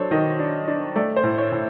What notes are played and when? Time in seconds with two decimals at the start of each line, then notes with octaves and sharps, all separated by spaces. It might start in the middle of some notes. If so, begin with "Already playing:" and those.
Already playing: F#3 D4 A4 C5 C#5
0.11 D#3 D#5
0.39 D4
0.68 D4
0.96 A3 D5
1.17 C5
1.24 A2
1.38 C#5
1.52 A2